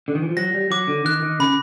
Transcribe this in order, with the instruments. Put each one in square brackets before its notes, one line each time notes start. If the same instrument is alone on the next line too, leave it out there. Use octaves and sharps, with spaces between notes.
[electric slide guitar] D3
D#3
E3
F3
[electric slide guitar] F#3 [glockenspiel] A#6
[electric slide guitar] G3
[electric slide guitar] F#3 [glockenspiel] D6
[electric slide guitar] D3
[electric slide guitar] D#3 [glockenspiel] F#6
[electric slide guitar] D#3
[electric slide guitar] C#3 [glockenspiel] B5